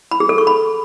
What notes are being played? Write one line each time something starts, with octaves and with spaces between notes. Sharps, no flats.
B5
G#4
A4
C#6
B5